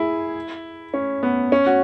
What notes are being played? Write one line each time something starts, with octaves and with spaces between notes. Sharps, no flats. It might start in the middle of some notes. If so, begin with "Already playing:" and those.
Already playing: E4 G#4
C#4
B3
C#4
F#4